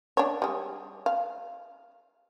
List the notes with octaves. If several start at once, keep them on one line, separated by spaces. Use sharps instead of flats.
D4 C#5
G3 G#3
F5